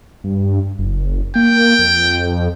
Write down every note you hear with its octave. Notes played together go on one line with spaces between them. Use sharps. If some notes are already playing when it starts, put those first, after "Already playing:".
G2
F#1
A#3 G5
F2